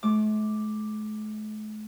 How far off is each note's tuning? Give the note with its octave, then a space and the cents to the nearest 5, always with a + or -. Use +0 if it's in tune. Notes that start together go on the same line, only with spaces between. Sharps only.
A3 -45 D6 +5